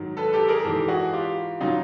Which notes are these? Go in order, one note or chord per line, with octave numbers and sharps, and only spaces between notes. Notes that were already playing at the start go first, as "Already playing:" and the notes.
Already playing: G#2 D#3 F#3
A4 B4
G4 A4
G#4 A#4
G#2 E3 G4 A4
F#4 G#4
F4 G4
C#3 F#3 D#4 F4